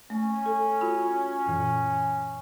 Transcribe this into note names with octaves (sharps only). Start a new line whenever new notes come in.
A3 C#4
A4
F4 F#4 B5
F#2 A#2 E3